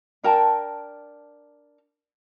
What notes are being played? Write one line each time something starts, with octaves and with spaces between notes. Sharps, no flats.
D4 A#4 G5 A5